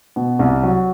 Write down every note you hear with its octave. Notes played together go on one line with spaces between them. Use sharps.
B2
C2
F#3